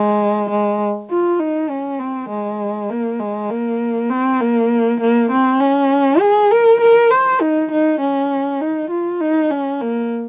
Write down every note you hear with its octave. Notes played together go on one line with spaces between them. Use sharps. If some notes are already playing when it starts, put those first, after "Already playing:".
Already playing: G#3
G#3
F4
D#4
C#4
C4
G#3
A#3
G#3
A#3
C4
A#3
A#3
C4
C#4
G#4
A#4
A#4
C5
D#4
D#4
C#4
D#4
F4
D#4
C#4
A#3